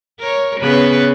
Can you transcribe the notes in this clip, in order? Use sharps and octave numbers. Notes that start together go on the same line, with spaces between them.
A#4 C#5
C#3 B3 B4